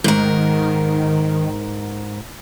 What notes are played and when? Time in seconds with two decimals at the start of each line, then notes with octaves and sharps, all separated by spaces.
0.04 G#2 D#3 A#4